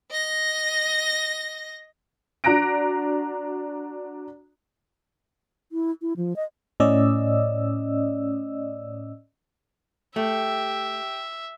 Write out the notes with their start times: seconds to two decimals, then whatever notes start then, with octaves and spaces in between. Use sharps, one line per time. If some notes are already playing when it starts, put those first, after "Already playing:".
0.10 D#5 A#6
2.44 D4 F#4 A#5 F#6 A#6 D7
5.72 E4
6.02 E4
6.17 F3
6.36 D#5
6.80 A2 C#4 D5 D#5 E6
10.16 A3 G4 E5